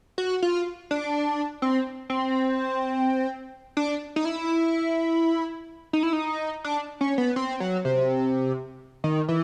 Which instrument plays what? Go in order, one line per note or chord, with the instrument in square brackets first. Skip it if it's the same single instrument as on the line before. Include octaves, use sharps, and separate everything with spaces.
[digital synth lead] F#4
F4
D4
C4
C4
D4
D#4
E4
D#4
E4
D#4
D4
C#4
B3
C4
F#3
C3
D#3
E3